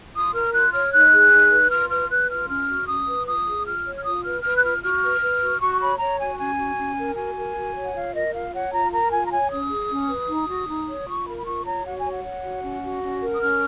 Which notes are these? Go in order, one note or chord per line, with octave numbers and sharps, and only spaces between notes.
F4 D#6
A#4 F6
F4 F#6
C#5 F6
D#4 F#6
G#4
D#4
B4
F4 F6
B4 F6
B4 F#6
F4 F6
C#4 F6
F#4
C#4 D#6
B4
F4 D#6
G#4
F4 F6
C#5
F6
F4 D#6
B4 F6
B4 F6
F#6
F4 F6
F#4 F6
B4
B4
F#4
F#4 C#6
C#5 B5
C#5 A#5
F#4 G#5
C#4 G#5
F#4
C#4
A#4
F#4 G#5
A#4
F#4
C#5
F#5
F4 F5
A#4 D#5
F4 F5
C#5 F#5
F4 A#5
A#4 A#5
F4 G#5
A#5
C#5 G#5
C#4 D#6
G#4
C#4
B4
D#4
F#4
D#4
C#5
F4 C#6
A#4 B5
B5
F4 C#6
C#5 A#5
F#4 F#5
G#5
C#5
F#5
C#5
F#4
C#4
F#4
C#4
A#4
D#6
C#4 F6